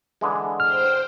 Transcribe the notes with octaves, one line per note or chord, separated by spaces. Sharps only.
D3 E3 G#3
C5 G5 F6